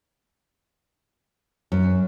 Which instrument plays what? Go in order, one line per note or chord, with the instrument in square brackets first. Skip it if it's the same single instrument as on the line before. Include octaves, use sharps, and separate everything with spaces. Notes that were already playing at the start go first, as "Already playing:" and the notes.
[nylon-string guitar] F#2